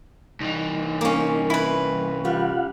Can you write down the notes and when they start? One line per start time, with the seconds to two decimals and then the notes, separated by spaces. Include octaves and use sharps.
0.40 C2 E3 D#4
1.01 A#3 C#4
1.50 E4 B4
2.25 G3 F4 F5 F#5